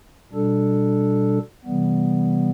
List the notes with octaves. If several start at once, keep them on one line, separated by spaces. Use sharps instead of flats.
B2 G3 D4 A4
C3 E3 G3 B3